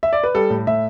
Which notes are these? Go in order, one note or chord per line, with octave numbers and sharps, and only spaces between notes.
E5
D5
B4
G3 A4
A2
A2 E5